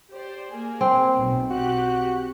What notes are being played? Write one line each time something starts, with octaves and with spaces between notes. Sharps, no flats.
G4 C5 D5
A#3 G#4
C4
B1 B2
F#4 G4 F#6